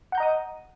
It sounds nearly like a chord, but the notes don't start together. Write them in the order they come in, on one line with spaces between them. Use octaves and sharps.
F#5 G6 A#5 D#5 D#6